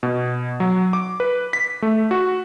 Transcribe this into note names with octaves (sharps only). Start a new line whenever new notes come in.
B2
F#3
D6
B4
B6
A3
F#4